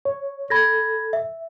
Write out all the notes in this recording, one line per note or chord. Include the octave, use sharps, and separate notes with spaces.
C#5
A4 B5 G#6 A#6
E5